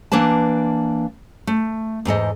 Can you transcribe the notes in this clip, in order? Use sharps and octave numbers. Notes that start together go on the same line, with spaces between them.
E3 A#3 D4 B4 A5
A3
E2 G#2 A4 D#5